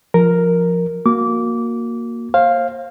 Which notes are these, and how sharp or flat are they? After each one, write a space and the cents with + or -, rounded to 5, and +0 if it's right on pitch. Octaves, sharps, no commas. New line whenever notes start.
F3 +0 A#4 +0
A#3 +0 F#4 -20 D6 -20
C5 +35 F5 +0